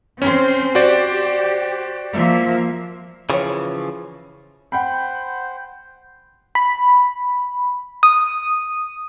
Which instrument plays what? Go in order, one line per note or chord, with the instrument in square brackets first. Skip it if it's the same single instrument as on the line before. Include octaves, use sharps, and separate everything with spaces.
[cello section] C4 C5 [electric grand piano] C#4
[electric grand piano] F#4 C5 D5 [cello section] G4
[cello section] F3 A#3 E5
[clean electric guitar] C#3 E3 F3 [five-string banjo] G4 G#4 C#5
[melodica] C5 [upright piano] F#5 G5 B5
[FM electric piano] B5
D#6